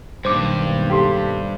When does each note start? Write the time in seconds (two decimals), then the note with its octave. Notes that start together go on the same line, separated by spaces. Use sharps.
0.25 B1 G2 D#3 A#3 C5 D6
0.90 G4 A4 C6